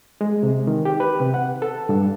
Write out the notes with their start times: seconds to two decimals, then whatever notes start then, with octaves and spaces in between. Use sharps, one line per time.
0.21 G#3
0.43 C3
0.67 D#3
0.85 G4
1.00 B4
1.20 C3
1.34 F#5
1.62 A4
1.89 G2